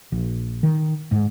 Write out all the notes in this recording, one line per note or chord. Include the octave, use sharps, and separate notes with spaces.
A#1
D#3
G#2